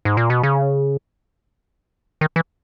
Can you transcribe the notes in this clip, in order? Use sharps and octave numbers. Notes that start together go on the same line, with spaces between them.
G#2
A#2
B2
C#3
D#3
E3